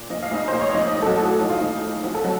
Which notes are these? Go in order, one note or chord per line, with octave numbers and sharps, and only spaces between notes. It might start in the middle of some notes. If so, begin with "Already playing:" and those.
Already playing: A#2
F3 D#5
F5
A#1 D#4 D#5
A#2 C5
C#5
F3 D#4 D#5
A1
A4
F#3 F#4
A2
F3 D#4
F4
A#1 D#3 D#4
A2
F3 F#4
A4
F#3 F#4